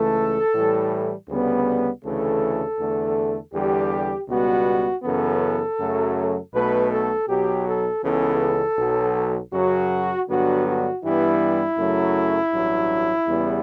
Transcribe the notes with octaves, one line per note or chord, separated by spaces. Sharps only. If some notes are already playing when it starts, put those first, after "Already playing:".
Already playing: C#2 C#3 E3 A3 A4
A2 E3 G3
D2 C#3 G3 B3
D2 C#3 E3 A3 A4
E2 D3 A3
E2 D3 G3 G4
C#2 B2 G3 B3 F#4
F#2 C#3 E3 B3 A4
F#2 C#3 F#3 A3
B1 B2 A3 B4
A4
B1 B2 F#3 G4
A4
C#2 C#3 E3 B3 A4
B1 B2 F#3
F#2 C#3 F#3 F#4
G2 D3 F#3 B3 F#4
F#4
G2 E3 G3 B3 E4
F#2 C#3 F#3 A3
A1 G2 F#3
E2 C#3 G3 B3